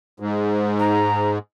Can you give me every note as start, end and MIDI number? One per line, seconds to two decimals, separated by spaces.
0.20 1.38 44
0.79 1.30 82